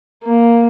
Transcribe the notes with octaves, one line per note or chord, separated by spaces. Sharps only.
A#3